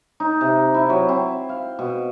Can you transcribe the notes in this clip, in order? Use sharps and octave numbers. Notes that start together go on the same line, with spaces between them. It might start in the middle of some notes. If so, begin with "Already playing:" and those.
D#4
C3
E4
F#3
C4
F5
B2